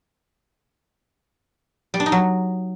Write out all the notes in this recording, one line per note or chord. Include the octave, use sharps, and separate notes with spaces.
G3
D4
D#4
F#3